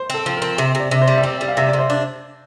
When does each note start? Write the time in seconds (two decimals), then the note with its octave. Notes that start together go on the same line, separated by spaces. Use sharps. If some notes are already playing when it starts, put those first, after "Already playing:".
Already playing: C5
0.10 C4 A4
0.26 F3
0.37 A#4
0.42 C4
0.58 C3 E5
0.75 C3
0.80 D5
0.91 C3
1.02 C5
1.08 G3
1.17 E5
1.23 C4 D5
1.41 G3
1.48 F5
1.57 C3 E5
1.69 C3 D5
1.79 C5
1.90 D4